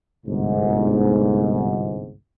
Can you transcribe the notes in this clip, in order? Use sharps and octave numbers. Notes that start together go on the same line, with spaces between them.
G1 C2 G#2